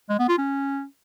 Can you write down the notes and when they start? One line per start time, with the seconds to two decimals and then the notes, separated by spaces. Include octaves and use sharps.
0.09 G#3
0.19 B3
0.29 F4
0.38 C#4